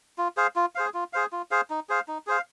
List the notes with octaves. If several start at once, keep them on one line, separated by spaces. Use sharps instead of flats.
F4
G#4 C5 F5
F4
G#4 C5 F5
F4
G#4 C5 F5
F4
G#4 C5 F5
D#4
G#4 C5 F5
D#4
G#4 C5 F5